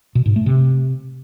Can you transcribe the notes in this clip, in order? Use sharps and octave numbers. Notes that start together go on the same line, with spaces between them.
B2
G#2
A3
C3